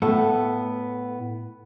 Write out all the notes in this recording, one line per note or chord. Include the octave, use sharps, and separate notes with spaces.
A2 A3 B3